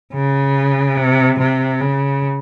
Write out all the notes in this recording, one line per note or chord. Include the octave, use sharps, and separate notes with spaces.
C#3
C3
C3
C#3